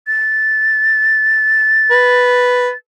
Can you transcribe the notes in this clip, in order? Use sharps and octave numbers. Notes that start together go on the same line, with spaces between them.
A6
B4